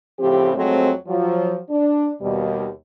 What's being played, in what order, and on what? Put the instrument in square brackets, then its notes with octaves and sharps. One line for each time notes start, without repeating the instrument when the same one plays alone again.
[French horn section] A2 C#3 F3 C4 G4
F2 F#3 G#3 A3 C4
F3 F#3
D4
D#2 B2 G3